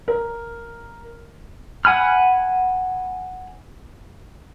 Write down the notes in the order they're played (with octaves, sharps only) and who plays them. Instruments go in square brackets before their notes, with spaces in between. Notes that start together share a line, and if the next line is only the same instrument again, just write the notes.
[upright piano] A#4
[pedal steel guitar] F#5 G#5 B5 F6